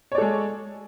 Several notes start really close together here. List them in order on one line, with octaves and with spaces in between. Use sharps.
C#5 D5 A4 G#3